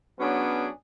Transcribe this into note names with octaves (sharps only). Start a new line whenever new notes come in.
F#3 B3 C#4 D4 G#4